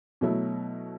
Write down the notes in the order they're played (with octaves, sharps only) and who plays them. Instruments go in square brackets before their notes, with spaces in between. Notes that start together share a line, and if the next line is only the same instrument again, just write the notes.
[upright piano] B2 F#3 A3 E4